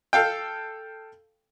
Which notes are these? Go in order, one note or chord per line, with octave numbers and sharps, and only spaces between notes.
A4 F5 G5